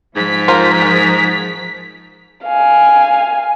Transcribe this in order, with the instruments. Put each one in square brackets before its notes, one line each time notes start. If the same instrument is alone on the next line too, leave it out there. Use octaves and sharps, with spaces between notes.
[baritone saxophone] G#2 [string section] F3 B6
[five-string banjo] F4 A#4 C5
A#4
[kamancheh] F5 G#5